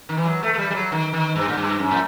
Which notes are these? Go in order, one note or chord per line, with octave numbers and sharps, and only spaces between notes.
D#3
E3
F#3
A3
A3
G3
G3
F#3
D#3
D#3
G2
A2
G2
F#2
A2